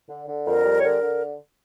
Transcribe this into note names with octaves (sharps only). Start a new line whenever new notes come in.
D3
D3
F2 A#4
G3
C#5
D3 A#4
D3